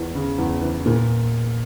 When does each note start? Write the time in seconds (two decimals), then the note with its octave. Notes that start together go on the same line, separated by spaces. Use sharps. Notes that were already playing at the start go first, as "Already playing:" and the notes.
Already playing: E2
0.15 C#3
0.38 E2
0.62 E3
0.86 A#2